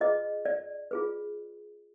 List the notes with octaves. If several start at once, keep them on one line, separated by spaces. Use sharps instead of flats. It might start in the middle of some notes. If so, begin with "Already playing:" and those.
F4 G#4 B4 D#5
D5
F4 G#4 B4